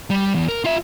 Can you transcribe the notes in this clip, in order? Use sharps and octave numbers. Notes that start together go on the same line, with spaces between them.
G3
E2
A#4
F4 E5